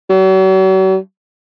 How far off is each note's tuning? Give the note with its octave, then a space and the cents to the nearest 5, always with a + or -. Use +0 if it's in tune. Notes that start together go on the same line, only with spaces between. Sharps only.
F#3 +45